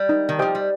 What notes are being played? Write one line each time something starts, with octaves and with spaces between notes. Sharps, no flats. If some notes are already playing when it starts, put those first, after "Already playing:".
Already playing: G3
D#4
D#3
F3 G4 C5 D#5 G5
G3